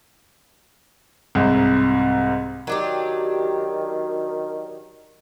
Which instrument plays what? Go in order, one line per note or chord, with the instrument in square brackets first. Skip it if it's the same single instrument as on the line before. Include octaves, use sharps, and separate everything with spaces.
[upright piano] C2 G#2
[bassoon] D#3 [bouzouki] F#3 D4 G4